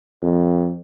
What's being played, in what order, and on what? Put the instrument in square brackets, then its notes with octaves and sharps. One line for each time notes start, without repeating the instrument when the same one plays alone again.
[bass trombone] F2